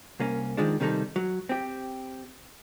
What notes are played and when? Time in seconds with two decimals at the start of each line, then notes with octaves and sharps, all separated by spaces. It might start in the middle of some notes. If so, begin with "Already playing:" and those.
0.20 C2 A#3 C#4
0.57 D#3 F3 G#3 D4
0.80 C3 D#3 G3 D#4 A4
1.16 F#3
1.49 C4 G4